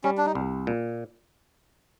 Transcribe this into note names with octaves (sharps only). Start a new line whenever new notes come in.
G3 C#4
D4
D#4
C2
A#2